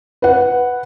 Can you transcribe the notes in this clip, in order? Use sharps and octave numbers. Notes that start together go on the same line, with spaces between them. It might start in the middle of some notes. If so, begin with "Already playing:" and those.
B4 F#5